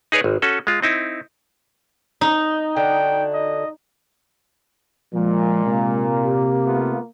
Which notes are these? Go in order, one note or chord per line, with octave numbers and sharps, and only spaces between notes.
D#4 G#4 B4 C#5 D5
G#1
C#4 F#4 A4
G#3 F4
C4 D#4 E4
D#4
D3 F#4 G5
D#5
A#2 F3 G#3
C3 A#3
G4
A3 B3 F4